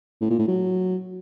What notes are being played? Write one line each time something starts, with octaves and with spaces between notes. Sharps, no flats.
A2
A#2
A2
F#3